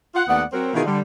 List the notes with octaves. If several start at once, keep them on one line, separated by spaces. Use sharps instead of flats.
F4 F#5
D#2 A3 B3 D5 F#5
F#3 C4 A#4
B2 D#3 E3 D#4 F4 G#4
D3 G3